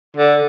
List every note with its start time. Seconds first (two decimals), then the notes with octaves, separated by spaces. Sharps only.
0.17 D3